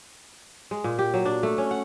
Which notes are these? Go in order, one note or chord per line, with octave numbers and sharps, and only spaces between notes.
G#3
A#2
G4
F#3
D4
A3
C#4
F#5